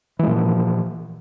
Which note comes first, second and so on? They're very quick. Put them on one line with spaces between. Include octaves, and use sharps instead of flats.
E3 G#3 A#2 F3